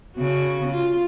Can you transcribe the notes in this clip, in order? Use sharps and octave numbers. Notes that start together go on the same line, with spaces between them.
C#3 F#4
F4